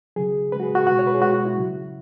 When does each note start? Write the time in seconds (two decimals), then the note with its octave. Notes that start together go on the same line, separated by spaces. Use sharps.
0.16 C#3 F#3 G#4
0.52 C#3 G#3 B4
0.60 F#4
0.63 G#4
0.75 F#4
0.87 B2 G#3 F#4
0.99 C#5
1.07 B4
1.14 G#4
1.22 B2 G#3 F#4
1.34 F#4
1.45 E4
1.58 C#3 F#3